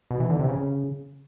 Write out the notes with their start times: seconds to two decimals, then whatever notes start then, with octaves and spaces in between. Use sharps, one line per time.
0.11 B2
0.20 E3
0.30 D3
0.39 C3
0.49 C#3